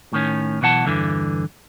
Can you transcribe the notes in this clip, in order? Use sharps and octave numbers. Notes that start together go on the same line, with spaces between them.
A2 D#3 C#4
B1 B2 E3 F#5 A5
E2 G2 D3 E3